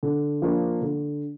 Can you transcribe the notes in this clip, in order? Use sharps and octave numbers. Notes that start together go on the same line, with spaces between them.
D3
F3 A#3 D4 F4
D3